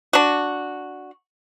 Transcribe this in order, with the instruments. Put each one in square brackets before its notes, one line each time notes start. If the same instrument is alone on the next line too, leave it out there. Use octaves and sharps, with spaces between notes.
[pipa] D4 F#4